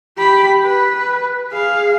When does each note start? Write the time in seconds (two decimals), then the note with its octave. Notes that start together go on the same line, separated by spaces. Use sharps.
0.17 G4 B5
0.65 B4
1.51 G#4 F5